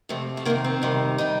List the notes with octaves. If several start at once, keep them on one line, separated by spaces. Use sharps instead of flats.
F2 C3 F3 A3
A3
F2 C3 D#3 A#3
C4
F2 C3 D#3 G3
D#3 G3 D#4